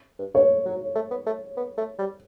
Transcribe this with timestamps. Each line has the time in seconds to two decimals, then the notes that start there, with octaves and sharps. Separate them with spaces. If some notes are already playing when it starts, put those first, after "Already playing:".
0.19 G2
0.34 G2 C#5
0.66 F#3
0.95 A3
1.11 B3
1.27 A3
1.57 B3
1.78 A3
1.99 G3